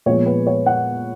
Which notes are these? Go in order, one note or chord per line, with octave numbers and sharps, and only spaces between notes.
A#2 F3 G#3 B3 C#5
B4
C#5
F#5